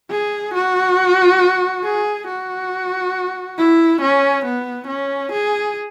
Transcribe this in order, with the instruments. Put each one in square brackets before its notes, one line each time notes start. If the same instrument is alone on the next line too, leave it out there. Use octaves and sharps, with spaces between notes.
[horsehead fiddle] G#4
F#4
G#4
F#4
E4
C#4
B3
C#4
G#4